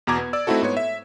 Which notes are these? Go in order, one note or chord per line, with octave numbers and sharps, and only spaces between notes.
E2 B2 A#5 D6 G#6
B3
D5 E6
A3 C4 D#4 E4 F#4 A4
G#2 B3 C#5
E5